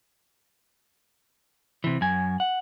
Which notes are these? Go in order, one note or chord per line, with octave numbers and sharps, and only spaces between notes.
C3 E3
F#2 G#5
F#5